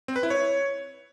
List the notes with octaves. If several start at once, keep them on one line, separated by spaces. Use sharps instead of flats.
C4
B4
E4
C#5